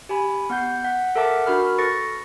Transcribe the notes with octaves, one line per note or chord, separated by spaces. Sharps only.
G4 G#5 B5
B3 F#5 G6 C7
F#5 B6
A4 A#4 E5 F#5 A5 D6
D4 F#4 A#4 B5 F6
A4 B4 C#6 A6 A#6 C#7